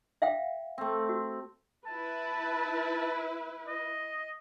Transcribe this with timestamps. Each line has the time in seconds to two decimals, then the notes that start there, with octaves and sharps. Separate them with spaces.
0.22 E5 F5 G5
0.78 A3 C4
1.09 F#4
1.86 E4 B4 A5
3.68 D#5